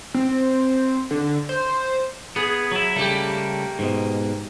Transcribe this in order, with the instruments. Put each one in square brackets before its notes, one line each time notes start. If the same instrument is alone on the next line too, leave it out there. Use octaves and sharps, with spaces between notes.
[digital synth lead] C4
D3
C5
[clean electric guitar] B3 [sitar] G#4
[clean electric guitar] F#3 E4
[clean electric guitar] C#3 G3 A3 [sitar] A#3 G4
[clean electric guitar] G#2 B2